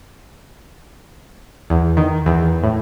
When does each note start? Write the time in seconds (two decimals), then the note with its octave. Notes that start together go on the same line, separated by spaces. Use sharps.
1.70 E2
1.97 D#3
2.26 E2
2.64 A2